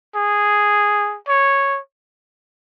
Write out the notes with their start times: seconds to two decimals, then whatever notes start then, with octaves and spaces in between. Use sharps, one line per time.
0.16 G#4
1.28 C#5